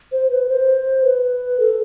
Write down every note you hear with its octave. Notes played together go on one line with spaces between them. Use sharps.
C5
B4
C5
B4
A4